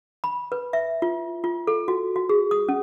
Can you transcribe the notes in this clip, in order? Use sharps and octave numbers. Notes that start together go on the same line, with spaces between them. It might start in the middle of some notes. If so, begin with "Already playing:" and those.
B5
B4
E5
F4
F4
A4
F#4
F#4
G#4
D#6
C#4